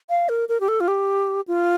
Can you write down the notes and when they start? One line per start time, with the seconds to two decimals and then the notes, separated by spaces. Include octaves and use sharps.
0.10 F5
0.29 A#4
0.49 A#4
0.60 G4
0.68 A4
0.80 F4
0.88 G4
1.47 F4